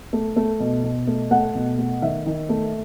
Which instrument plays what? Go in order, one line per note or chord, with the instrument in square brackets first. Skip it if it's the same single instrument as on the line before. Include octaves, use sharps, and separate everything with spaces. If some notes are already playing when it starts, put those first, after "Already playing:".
[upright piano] A3
A3
B2
B2
A3
A3 F#5
B2
A3
D#3 E5
D#3
A3